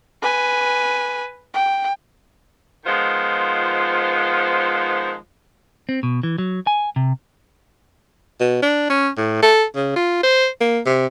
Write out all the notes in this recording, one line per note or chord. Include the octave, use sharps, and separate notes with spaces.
B4 G#5
G5
D#3 F3 G#3 B3 F4 C5
C4
B2
E3
F#3
G#5
C3
B2
D4
C#4
A2
A4
C#3
F4
C5
A#3
C3